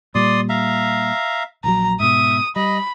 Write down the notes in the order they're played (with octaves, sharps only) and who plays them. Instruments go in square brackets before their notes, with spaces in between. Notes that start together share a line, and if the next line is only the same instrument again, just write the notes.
[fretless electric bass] A#2 G3 [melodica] D5 C6 D#6
[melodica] E5 F5 A#5
[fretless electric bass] A#1 D#3 F#3 [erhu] A#5
[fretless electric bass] G#2 B2 [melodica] E5 [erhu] D#6
[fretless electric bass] G3 [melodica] D#5 [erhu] B5